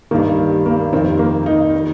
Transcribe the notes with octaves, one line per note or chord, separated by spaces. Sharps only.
G2 D#3 A#3
G3
A#3
F2 C3 D#3 C4
A#3
D#3 D#4
D#3